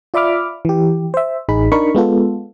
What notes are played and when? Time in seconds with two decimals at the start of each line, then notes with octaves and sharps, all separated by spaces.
0.14 F4 D5 E5 B5 D6 F6
0.65 E3 G4
1.14 C5 E5
1.49 A1 D#4 G#4 B5
1.72 D4 D#4 A#4 B5 C#6
1.95 G#3 B3 F4 A4